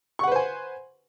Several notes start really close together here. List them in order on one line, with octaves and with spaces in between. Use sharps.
C#6 F#5 B4 C5 G#5